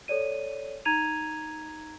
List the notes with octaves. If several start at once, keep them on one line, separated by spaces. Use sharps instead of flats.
A4 C#5 D5 D#7
D#4 A#5 G#6 D#7 F7